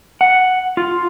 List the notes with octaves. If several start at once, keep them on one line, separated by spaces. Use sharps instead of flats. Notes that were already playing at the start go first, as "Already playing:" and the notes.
F#5
F4